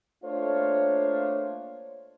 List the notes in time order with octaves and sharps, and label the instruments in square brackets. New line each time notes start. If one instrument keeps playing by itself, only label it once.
[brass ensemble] A3 A#3 D4 F4 C5 C#5